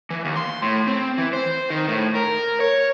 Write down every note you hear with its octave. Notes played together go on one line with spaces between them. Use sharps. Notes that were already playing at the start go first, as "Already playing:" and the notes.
E3
D#2
C6
A2
C4
E3
C5
D#3
A2
A#4
C#5